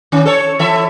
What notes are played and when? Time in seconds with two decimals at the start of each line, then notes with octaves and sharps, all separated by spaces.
0.12 D#3 C#4
0.26 A4 C#5
0.59 E3 A4 E5